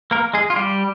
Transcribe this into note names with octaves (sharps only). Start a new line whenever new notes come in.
A#3 A#4
G#3 G#4
F4
G3 G4